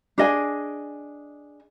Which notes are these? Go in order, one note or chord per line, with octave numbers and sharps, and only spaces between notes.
D4 G#4 D#5 G#5